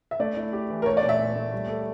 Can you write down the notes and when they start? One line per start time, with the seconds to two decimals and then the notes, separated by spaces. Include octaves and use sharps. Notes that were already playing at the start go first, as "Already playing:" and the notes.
0.11 E5
0.20 A3 D5
0.37 E4
0.53 G4
0.70 E3
0.82 A#4
0.86 A3 C#5
0.97 D5
1.03 A#2
1.09 E5
1.19 A#2
1.36 A3
1.53 G3
1.69 A4